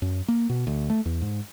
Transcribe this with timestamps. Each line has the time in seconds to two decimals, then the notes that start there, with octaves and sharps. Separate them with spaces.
0.02 F#2
0.28 A#3
0.49 B2
0.67 D2
0.90 A3
1.05 E2
1.22 G#2